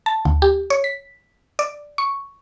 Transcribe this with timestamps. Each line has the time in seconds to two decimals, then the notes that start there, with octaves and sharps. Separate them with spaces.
0.06 A5
0.25 D2
0.42 G4
0.70 C#5
0.84 B6
1.59 D5
1.98 C#6